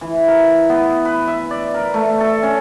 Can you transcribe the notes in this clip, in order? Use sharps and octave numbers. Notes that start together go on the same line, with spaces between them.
E3
A#4
B3
B4
E5
D5
A#4
A3
A4
C#4